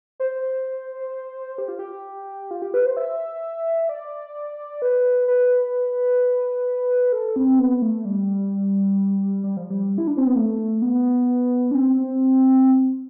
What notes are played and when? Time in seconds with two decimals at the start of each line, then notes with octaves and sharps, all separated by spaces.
0.20 C5
1.58 G4
1.68 F4
1.79 G4
2.51 F4
2.62 G4
2.74 B4
2.85 C5
2.97 E5
3.89 D5
4.82 B4
5.28 B4
7.12 A4
7.36 C4
7.59 B3
7.82 A3
8.05 G3
9.44 G3
9.57 F3
9.70 G3
9.98 E4
10.07 D4
10.17 C4
10.27 B3
10.36 A3
10.82 B3
11.71 D4
11.75 C4